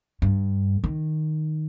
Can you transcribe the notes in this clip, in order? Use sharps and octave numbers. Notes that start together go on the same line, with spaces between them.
G2
D#3